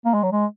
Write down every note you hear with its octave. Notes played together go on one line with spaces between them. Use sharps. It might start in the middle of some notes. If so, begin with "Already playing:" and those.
A#3
G#3
F#3
G#3